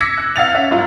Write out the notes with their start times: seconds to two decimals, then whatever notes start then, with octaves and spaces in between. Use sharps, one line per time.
0.01 D6 E6 G#6 A#6 B6 C#7
0.18 F#6
0.36 F5 F#5 A6 F7
0.54 C#4 E5
0.71 G1 F#2 F4